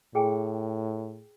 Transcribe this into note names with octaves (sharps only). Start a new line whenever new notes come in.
A2 G#4 G5 G#5